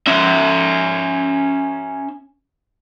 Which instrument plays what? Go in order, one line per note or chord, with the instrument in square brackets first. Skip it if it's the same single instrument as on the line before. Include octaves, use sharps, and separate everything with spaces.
[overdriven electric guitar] C#4 E5